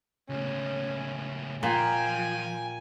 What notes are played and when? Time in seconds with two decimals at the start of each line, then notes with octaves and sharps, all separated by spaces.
0.30 C#2 A2 C#4
1.63 A#2 F3 G5 G#5